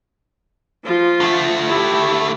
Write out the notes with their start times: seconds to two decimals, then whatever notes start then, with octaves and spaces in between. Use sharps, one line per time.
0.85 F3 F4
1.21 D3 A3
1.68 E4 G4